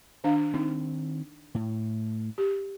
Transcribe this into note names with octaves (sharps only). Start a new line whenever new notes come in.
D#3 D4 F5
D#3 C4 D#4
A2
G4